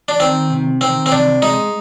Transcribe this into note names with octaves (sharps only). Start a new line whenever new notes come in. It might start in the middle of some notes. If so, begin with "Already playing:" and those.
D4
D#3 C4
C3
D#3 C4
C4
C3 D4
G#3 D#4